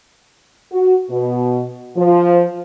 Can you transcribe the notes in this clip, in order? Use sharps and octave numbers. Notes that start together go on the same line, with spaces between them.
F#4
B2
F3